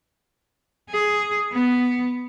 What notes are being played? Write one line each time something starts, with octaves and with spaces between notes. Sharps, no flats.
G#4
B3